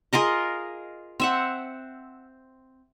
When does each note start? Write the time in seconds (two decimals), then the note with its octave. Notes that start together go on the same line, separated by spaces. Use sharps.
0.13 F4 G#4 A#4 D#5
1.20 C4 E5 F#5